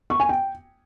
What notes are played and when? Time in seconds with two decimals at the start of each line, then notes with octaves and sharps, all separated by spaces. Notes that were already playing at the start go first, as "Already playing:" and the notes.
0.10 C#6
0.20 G#5
0.29 G5